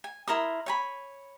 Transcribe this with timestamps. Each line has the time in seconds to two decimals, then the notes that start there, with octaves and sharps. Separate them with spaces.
0.04 G#5
0.28 E4 A#4 C6 D#6
0.66 C#5 G#5 B5